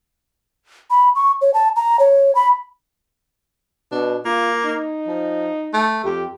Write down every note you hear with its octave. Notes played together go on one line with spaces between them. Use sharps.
B5
C#6
C#5
A5
A#5
C#5
B5
B2 D4
A#3 F4
D#4
F3
A3
F2 G4